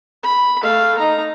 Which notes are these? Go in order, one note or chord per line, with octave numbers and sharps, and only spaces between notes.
B5
A3 F5
D#4 A#5